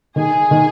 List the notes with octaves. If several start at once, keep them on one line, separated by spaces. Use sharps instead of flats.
D#3 G#4
D#3